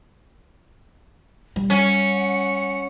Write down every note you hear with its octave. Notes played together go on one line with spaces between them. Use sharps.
G3
C#4 F#5